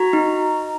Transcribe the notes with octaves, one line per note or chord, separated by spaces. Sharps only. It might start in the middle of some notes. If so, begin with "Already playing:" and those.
Already playing: F#4 A#5
D#4